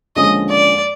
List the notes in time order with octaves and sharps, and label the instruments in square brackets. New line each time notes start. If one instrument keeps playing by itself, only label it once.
[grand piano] D#2 D3 F3 G#3 C#4 [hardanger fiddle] D#5
[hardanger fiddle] D5